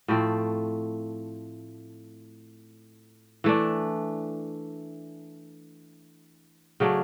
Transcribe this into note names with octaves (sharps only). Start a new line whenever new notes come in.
A2 F3 A3 C4
E3 A3 D4
C#3 F#3 A3 D4